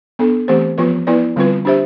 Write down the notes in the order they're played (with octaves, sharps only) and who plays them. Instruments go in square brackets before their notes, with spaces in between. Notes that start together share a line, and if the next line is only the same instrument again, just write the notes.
[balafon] B3 D4 A4
E3 A3 C4 G4 C5
F3 B3 F4 B4
B3 E4 B4 D5
D3 G3 C4 F4 B4
D4 G4 C5 E5